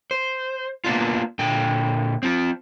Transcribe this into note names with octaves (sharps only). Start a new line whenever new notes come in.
C5
A#3 B3 D4 F4
A#2 D3 G5
C4 F4